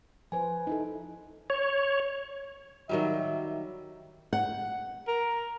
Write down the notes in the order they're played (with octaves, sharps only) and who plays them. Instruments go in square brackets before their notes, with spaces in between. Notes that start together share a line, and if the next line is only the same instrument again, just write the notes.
[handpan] F3 B4 C5 [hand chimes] G#5
[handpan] D#4 E4 A4
[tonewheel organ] C#5
[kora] D#3 F#3 G3 [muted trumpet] E5
[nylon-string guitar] F#5
[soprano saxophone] A#4